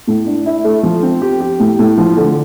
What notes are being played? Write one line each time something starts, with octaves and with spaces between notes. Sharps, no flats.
A2
D4
E4
A3
F3
C4
G4
G4
A2
A2
F3
D3